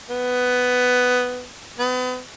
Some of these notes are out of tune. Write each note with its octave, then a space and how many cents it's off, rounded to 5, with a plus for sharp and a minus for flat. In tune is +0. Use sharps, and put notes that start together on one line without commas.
B3 +10
B3 +35